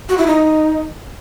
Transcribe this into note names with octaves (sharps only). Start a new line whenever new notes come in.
F#4
E4
D#4